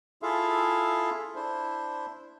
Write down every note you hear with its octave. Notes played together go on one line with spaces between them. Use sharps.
E4 F4 G#4 A4 E5 F5
D4 E4 C5